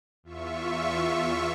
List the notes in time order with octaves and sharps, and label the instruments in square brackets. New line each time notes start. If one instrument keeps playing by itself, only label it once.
[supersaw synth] E2 F4 E5 C#6